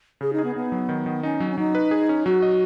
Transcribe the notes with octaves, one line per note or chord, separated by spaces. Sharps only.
C#3 G#4
D#4
G#4
B3
B3 D#4
F#3
D#3
D#3
C#4 D#4
F#3
C#4
F#3 D#4
B4
G#4
C#4
F#3 F#4
D#5